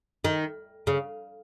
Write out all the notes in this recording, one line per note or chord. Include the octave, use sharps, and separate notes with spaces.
D#3
C#3